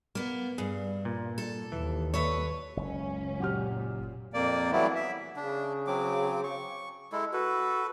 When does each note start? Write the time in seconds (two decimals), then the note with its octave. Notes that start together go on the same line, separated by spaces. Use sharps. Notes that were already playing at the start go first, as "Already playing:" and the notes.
0.15 A#3 B3
0.58 G2 G#4
1.05 A#2
1.38 A4
1.72 D#2 E3
2.14 A4 B4 C#5 E5
2.77 F#1 C#2 C#4
3.40 A#2 F#3 G4 F6
4.34 F2 A#3 D5
4.72 E3 F#3 G3 A3 B3 E4
4.95 E5
5.36 C#3 D4
5.87 F#3 C4 D6
6.44 C#6
7.12 G#3 E4 A4
7.33 F#4 A4 B4